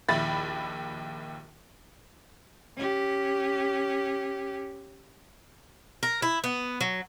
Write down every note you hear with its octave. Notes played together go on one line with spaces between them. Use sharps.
A#1 D#2 E4 B5 A6
C#4 G4
A#4
E4
B3
F#3